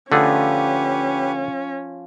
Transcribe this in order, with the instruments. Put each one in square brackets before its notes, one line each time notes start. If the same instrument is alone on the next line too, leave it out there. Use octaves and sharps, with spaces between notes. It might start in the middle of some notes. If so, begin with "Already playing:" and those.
[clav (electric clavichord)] D3 A3 G#4 [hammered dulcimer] F3 [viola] C#4 [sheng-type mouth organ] G4 B4